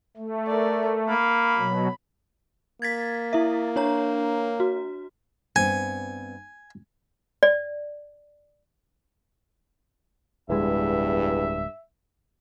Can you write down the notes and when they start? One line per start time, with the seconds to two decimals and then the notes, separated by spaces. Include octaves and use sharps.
0.17 A3
0.47 A#4 D5
1.09 A#3 B5
1.57 B2 F#3
2.82 A#3 G#6 A6 B6
3.33 E4 E5
3.76 D4 C#5 A#5
4.60 F#4
5.56 G2 B3 C4 G#5
7.43 D5
10.50 D1 E2 G2 G#3 E5